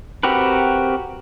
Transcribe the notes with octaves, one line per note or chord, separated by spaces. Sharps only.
C4 F#4 G4 A#4 B4